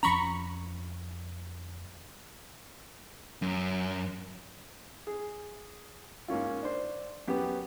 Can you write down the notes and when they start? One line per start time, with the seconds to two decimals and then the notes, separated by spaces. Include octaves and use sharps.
0.03 F2 F3 C#4 A#5 B5 C#6
3.42 F#2
5.07 G#4
6.28 G#2 A#3 C#4 F4
6.63 D4 C5
7.28 F#2 B3 G4